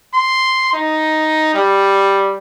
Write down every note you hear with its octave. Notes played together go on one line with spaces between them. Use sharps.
C6
D#4
G3